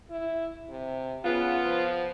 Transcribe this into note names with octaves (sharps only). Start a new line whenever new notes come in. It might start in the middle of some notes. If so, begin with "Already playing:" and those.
E4
C3
C#3 B3 F4
F3